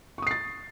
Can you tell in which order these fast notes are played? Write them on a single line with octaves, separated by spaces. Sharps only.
C#6 D#6 C7 A6